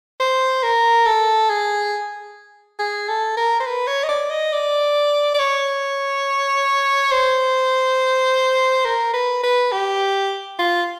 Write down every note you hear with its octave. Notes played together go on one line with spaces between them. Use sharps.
C5
A#4
A4
G#4
G#4
A4
A#4
C5
B4
C#5
D#5
D5
D#5
D5
D5
C#5
C5
A#4
B4
B4
G4
F4